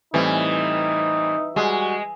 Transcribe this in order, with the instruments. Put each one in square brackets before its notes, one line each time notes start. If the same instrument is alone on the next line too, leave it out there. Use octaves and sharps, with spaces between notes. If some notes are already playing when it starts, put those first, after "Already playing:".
[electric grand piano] A2 G3 C4 [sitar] E3 [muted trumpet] D#4
[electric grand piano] G3 [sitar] G#3 [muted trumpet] F#4